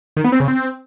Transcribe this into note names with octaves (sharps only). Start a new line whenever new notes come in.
D#3
B3
C4
C#3
C4